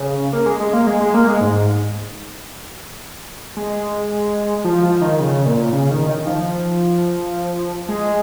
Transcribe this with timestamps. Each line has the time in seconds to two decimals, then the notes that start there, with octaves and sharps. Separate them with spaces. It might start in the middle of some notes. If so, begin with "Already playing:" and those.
Already playing: C#3
0.33 A#3
0.46 G#3
0.60 G#3
0.73 A#3
0.87 G#3
1.00 G#3
1.14 A#3
1.27 G#3
1.41 G#2
3.57 G#3
4.65 F3
4.83 F3
5.01 D#3
5.19 C#3
5.46 A#2
5.73 C#3
5.91 D#3
6.09 D#3
6.27 F3
7.89 G#3